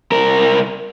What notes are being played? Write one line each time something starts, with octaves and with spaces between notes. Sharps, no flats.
C2 A#4